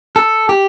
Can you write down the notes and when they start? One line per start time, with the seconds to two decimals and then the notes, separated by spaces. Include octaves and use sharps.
0.16 A4
0.49 G4